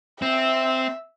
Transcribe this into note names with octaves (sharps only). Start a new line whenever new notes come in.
C4 E5